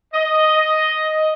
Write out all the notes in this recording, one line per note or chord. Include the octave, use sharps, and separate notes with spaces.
D#5